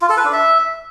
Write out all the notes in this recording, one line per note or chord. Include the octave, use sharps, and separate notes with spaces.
F4
A4
B4
D4
E5